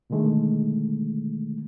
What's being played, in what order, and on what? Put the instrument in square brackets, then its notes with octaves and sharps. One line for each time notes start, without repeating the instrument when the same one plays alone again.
[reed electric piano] B2 D3 D#3 G#3 A3